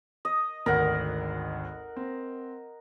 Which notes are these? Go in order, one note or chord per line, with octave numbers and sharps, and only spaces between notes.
D#5
G#1 D2 A#4 F#5
C4